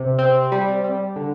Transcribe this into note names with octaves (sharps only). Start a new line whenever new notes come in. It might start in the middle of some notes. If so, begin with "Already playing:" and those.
Already playing: C3
C4
G3
G3
D3